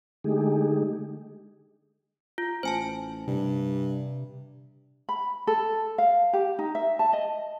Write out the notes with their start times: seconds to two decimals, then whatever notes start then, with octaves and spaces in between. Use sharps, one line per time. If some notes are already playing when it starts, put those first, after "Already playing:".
0.24 D3 G#3 A3 D#4 G4 G#4
2.38 F4
2.63 A1 C5 G#5 A5
3.27 G2 C3
5.09 B5
5.47 A4
5.98 F5
6.33 G4
6.59 D#4
6.75 E5
6.99 A5
7.13 D#5